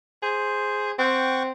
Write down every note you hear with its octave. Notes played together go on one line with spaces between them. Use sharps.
G#4 C5
C4 F#5 G5 C#6